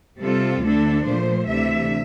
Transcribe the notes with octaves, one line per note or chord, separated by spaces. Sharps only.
C3 G3 C4 F4 A4
D2 D3 A3 D4 A4
A#2 F3 A3 C5
D2 C3 E3 A3 D4 E5